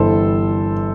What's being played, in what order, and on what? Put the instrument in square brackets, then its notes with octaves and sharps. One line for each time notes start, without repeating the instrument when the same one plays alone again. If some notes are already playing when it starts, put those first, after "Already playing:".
Already playing: [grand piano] G1 G2 E3 G3 A4 C5